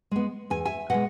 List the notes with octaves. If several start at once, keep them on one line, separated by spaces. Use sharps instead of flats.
G#3 B3
E2 G#5
E5 G#5
B2 G#3 D#5 F#5